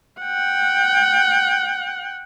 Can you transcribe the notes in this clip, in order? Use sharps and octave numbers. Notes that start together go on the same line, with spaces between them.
F#5 G5